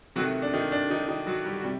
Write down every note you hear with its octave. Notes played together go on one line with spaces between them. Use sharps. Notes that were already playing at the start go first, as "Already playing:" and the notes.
C3 D#3 F#3 A3 F#4
D4
D#3 D#4
D4
D#3 D#4
D#3 D#4
F#3 F#4
G3 G4
F#4
C3 G3